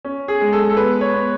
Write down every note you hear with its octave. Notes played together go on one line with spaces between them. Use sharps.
C#4
G#4
G#3
A4
A4
B3 B4
C#5
B3